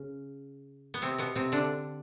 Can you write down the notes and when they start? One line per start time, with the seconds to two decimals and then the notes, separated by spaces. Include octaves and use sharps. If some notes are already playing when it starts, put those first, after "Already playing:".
Already playing: C#3
0.94 B3
1.02 C3 C4
1.18 B2 B3
1.36 C3 C4
1.52 D3 D4